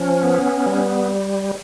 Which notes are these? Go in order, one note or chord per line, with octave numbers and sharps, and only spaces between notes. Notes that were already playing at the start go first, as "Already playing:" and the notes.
Already playing: F3 C#4
B3
G3